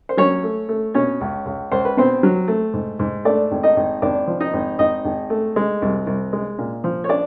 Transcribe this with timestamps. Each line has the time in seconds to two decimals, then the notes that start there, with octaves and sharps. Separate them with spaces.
0.09 C5
0.17 F#3 C#4 C#5
0.43 A3
0.69 A3
0.94 B2 C#4 C#5
1.21 C#2
1.46 C#2
1.72 C#2 C5
1.85 B4
1.97 B2 C4 C5
2.23 F#3
2.48 A3
2.74 G#2
2.99 G#2
3.25 A3 D4 D5
3.51 G#1
3.63 D#4 D#5
3.76 G#1
4.02 G#1 D4 D5
4.27 F3
4.40 D#4 D#5
4.53 G#1
4.79 G#1 D#4 D#5
5.05 G#1
5.30 A3
5.56 G#3
5.82 C2
6.07 C2
6.33 G#3
6.58 A#2
6.84 F3
7.04 C#5
7.09 D4 D5